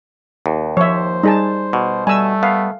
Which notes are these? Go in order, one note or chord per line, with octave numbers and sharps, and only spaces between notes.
D#2
F3 C5 C#5 E5
G3 D#4 G#4 A5
B2
G3 A3 G#5 E6
B3 F5